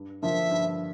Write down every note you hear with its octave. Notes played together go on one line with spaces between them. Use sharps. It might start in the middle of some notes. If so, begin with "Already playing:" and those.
Already playing: G2
D3 F3 A#3 F4 E5
G2